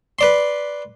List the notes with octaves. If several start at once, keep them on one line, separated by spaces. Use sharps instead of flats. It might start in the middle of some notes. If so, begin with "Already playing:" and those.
B4 D5 C6